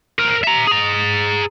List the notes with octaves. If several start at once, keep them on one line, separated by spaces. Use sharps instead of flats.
A#4 C5
E5 A#5
G#4 A#5